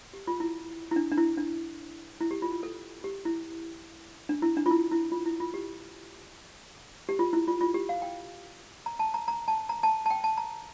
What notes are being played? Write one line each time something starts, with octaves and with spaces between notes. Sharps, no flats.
G4
F4
E4
E4
D4
D4
E4
D4
E4
G4
F4
F4
A4
G4
E4
D4
E4
D4
F4
E4
E4
F4
E4
F4
G4
G4
F4
E4
F4
F4
G4
F5
G5
A#5
A5
A#5
A#5
A5
A#5
A5
A5
G5
A5
A#5